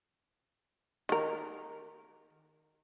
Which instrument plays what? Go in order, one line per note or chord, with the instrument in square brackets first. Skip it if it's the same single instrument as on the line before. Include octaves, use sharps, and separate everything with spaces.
[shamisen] D#3 A#4